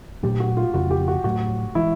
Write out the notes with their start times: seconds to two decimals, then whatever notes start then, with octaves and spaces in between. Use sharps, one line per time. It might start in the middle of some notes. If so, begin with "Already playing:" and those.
0.23 A#2 F#3 A3 D4 G4
0.40 F#4
0.57 F4
0.74 F2 C#3 F3 A3 F#4
0.91 G4
1.08 F#4
1.24 A2 F#3 A3 F#4
1.75 E3 G#3 E4